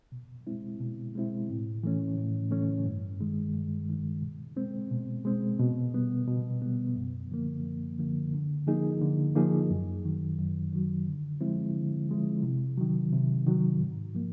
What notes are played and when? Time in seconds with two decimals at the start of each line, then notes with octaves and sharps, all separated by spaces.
0.12 B2
0.47 G#3 C4 E4
0.80 B2
1.15 G#3 C4 E4
1.50 A2
1.83 E3 A3 C#4
2.18 A2
2.51 E3 A3 C#4
2.86 G2
3.21 D#3 G#3
3.54 G2
3.89 D#3 G#3
4.22 B2
4.56 G#3 C4
4.91 B2
5.25 G#3 C4
5.59 B2
5.94 G3 B3
6.28 B2
6.62 G3 B3
6.96 F#2
7.31 D3 F3 A#3
7.65 F#2
7.99 D3 F3 A#3
8.33 D3
8.67 F3 A#3 D#4 G#4
9.01 D3
9.35 F3 A#3 D#4 G#4
9.70 F#2
10.05 D#3 F#3
10.39 F#2
10.73 D#3 F#3
11.07 D3
11.41 F3 G#3 C4 E4
11.76 D3
12.09 F3 G#3 C4 E4
12.43 C3
12.77 D#3 F#3
13.13 C3
13.47 D#3 F#3
13.80 G#2
14.14 F3 A#3